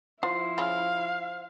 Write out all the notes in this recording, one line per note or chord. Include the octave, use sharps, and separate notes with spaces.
F3 E4 F4 C5
C#3 F4 F5 B5